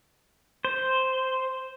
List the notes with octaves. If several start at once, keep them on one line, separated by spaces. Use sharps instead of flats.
C5